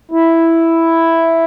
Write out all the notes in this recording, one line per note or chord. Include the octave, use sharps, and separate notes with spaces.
E4